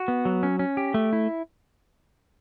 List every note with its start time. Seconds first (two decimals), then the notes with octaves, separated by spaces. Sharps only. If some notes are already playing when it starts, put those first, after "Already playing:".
Already playing: F#4
0.08 B3
0.25 F#3
0.43 C#4
0.59 C#4
0.77 G4
0.94 A3
1.13 E4